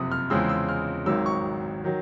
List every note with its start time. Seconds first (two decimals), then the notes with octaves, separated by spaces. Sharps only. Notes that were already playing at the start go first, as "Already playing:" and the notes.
Already playing: F#1 F2 C3 D#6
0.12 F6
0.30 E2 C#3 F3 G#3 C4 E6
0.49 E6
0.69 F6
1.06 G#1 G#2 D#3 F#3 E6
1.26 C#6
1.84 D#3 F#3